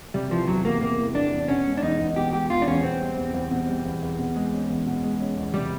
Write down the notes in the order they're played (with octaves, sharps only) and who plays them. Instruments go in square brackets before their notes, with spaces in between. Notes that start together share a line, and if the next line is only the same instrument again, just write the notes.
[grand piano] C3 [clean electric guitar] G3
[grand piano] E3 [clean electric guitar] F3
[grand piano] E2 [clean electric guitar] F#3
[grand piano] E2 [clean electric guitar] A#3
[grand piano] C3 [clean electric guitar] A#3
[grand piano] E3
[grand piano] E2 [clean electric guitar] D4
[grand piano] E2
[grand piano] B2 [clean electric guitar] C#4
[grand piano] G#3
[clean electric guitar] D4
[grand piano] E2 [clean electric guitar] D#4
[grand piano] E2
[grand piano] B2 [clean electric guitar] G4
[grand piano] G#3 [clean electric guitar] G4
[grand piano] E2 [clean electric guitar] F4
[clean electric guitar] D4
[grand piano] E2 [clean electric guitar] C#4
[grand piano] B2 [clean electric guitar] C4
[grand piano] G3
E2
E2
B2
G3
E2
E2
B2
G#3
C#4
E2
B2
G#3
C#4
E2
[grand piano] C3 [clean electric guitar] G3